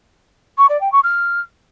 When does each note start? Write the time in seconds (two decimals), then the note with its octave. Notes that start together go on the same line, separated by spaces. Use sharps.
0.58 C#6
0.69 D5
0.81 G5
0.92 C#6
1.04 F6